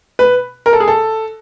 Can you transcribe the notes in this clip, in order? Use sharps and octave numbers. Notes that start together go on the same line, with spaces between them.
B4
A#4
A4
G#4
A4